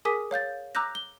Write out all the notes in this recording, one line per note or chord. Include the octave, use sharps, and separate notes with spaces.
G#4 A#4 G#5 D6 D#6 B6
C#5 F5 G6 A6
A#5 D6 E6 F#6 G6 A#6
G7